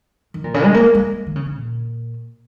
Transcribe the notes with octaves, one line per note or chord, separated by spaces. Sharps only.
D#3
A#2
C#3
G#3
A#3
G#3
D#3
C#3
C#3
A#2